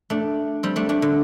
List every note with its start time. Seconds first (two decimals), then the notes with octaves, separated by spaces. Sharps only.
0.10 A3 D4
0.63 G3 C4
0.76 A3 D4
0.89 A3 D4
1.02 D3